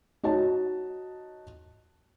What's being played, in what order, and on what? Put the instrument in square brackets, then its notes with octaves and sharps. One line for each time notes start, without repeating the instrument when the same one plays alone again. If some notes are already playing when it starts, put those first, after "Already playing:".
[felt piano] D#4 F#4 C#5 A5